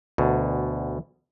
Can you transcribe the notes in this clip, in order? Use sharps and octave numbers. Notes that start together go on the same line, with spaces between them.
D2 B2